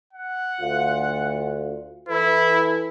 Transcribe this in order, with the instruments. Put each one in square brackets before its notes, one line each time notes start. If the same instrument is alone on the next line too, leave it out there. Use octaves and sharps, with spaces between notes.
[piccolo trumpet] F#5
[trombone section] D2 F4
[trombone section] E3 A4 B4 [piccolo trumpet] E4